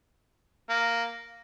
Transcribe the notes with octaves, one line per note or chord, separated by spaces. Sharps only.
A#3